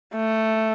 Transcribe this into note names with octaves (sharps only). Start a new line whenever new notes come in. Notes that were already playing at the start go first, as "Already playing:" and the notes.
A3